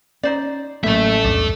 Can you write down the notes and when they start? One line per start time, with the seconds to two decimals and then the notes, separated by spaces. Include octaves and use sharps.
0.23 C#4 D#4 C5 D5
0.84 A1 F#3 A3 A#3 A4 E5
1.24 B1 E2 G2 D4